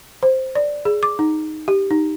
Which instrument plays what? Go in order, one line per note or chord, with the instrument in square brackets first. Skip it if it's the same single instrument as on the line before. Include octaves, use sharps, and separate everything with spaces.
[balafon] C5
D5
G#4
D6
D#4
G4
D#4